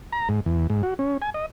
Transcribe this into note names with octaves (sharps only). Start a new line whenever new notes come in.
A#5
G#2
E2
G#2
F#4
C#4
G#5
D#5